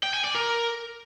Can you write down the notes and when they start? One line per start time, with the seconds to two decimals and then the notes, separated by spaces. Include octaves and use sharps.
0.03 G5
0.14 G#5
0.24 D5
0.35 A#4